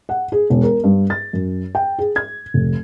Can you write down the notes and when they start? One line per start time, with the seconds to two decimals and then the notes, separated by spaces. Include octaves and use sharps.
0.09 F#5
0.32 G#4
0.50 E1
0.63 A#4
0.84 G2
1.10 A6
1.33 F#2
1.75 G5
1.99 G#4
2.16 G#6
2.54 F1